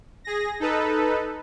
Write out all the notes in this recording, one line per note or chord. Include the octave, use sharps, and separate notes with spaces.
G#4 A#6
D#4 A4 B4